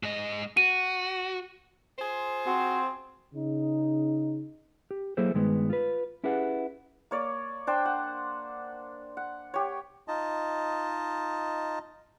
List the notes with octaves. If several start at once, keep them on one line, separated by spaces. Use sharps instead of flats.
G#2 D#5
F#4 D#7
F4 G#4 C5
C4 F#4
C#3 D#4
G4
F#3 A#3 E4 G#4 A4 C5
G2 D#3 G#3 B3
F4 B4
C#4 E4 G4 G#4 B4 F#5
A#3 C#5 D5
D4 C5 G5
F#5
F#5
G4 C#5
D#4 F4 D#5 A5